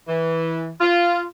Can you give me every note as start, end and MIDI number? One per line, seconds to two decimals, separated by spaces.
0.08 0.70 52
0.80 1.22 65